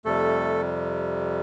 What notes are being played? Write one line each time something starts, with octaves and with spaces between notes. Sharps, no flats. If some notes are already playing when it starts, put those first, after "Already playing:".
F2 C3 G3 A3 A4